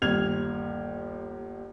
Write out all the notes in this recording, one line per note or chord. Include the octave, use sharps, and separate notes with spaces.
G1 D#2 F6 G#6 F7